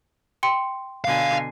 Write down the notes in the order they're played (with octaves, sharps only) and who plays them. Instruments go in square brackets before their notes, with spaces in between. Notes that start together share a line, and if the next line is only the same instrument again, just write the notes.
[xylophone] G5 C6 C#7
[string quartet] B2 D3 G#5 [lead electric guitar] F5